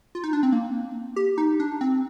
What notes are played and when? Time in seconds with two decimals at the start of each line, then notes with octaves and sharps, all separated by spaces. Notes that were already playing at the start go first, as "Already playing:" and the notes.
0.15 F4
0.24 D#4
0.33 D4
0.43 C4
0.52 A#3
1.16 G4
1.38 D#4
1.60 D4
1.81 C4